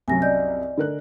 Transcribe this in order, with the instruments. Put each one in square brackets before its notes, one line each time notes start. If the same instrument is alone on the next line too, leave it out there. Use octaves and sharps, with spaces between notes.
[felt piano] C2 F#2 F#3 [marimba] G#5 A#6
[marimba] D5 D#5 G6
[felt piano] D3 A#4 F#6